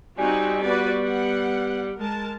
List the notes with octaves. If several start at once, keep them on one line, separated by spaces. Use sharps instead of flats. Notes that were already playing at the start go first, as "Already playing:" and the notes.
G3 C4 D#4 F#4 G#5
B3 F#4 B4 D5
F#5
G#3 A#4 A5